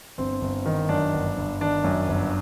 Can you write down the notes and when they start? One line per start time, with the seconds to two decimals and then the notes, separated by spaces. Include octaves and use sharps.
0.18 G1 C4
0.42 G1
0.66 D#3
0.89 F#2 D4
1.13 G1
1.37 G1
1.60 D#3 D4
1.84 F#2
2.08 G1